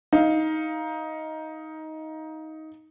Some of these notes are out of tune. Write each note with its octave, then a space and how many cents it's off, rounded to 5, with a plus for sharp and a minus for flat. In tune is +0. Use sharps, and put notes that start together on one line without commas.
D#4 +15 F5 +0